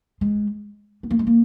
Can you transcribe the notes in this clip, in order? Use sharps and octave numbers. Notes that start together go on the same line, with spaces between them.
G#3
B3
A#3
G#3
A#3